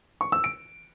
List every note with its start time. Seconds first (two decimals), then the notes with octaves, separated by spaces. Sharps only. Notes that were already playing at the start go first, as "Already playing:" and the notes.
0.21 C#6
0.32 E6
0.44 D7